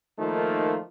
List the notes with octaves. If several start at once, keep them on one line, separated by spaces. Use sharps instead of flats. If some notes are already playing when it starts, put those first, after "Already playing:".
D#3 F3 A3 A#3 D#4 F4